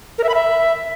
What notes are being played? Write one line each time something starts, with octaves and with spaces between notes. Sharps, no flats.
A#4
E5
B5
E5